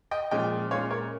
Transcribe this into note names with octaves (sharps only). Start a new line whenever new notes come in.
D#5 G5
A#2 F3 G#3 C#4 D#5 G5
A#2 G#3 C#4 C#5 F5
A#4 C#5